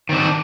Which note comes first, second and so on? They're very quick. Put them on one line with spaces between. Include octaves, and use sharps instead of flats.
D#3 C4 D4